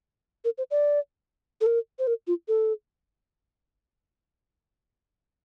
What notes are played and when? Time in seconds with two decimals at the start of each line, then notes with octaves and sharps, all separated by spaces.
0.45 A#4
0.58 C5
0.71 D5
1.61 A4
1.66 A#4
1.99 C5
2.07 A#4
2.27 F4
2.48 A4